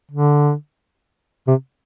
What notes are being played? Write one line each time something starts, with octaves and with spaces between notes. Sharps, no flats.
D3
C3